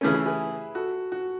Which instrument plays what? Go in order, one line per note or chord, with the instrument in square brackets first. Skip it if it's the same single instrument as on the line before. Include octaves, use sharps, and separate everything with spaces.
[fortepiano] C#3 E3 A3 C#4
[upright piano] E4 G#4
G#4 B4
F#4 A4
F#4